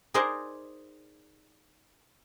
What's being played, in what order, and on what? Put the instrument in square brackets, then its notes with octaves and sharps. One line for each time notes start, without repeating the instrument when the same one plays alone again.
[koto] D#4 G#4 A#4 C5 D5 D#5